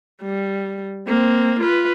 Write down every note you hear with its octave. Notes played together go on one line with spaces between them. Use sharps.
G3
A#3 C4
F4 B4